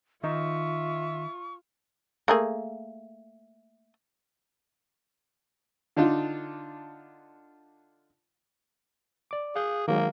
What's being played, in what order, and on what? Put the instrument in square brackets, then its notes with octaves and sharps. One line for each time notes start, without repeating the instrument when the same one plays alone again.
[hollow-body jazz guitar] D#3 D#4 D#5 [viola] F4 [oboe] E5 [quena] C#6
[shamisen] A3 A#3 G#4
[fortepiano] D3 D4 D#4 F4
[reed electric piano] D5 D6
[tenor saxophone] G#4 [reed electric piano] F5 F#6 G6
[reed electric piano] D#3 F#3 G#3 [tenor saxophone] A#3